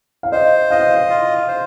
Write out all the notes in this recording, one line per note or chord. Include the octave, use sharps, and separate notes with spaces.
F5
C5 D#5
D#5 F5
F4
C5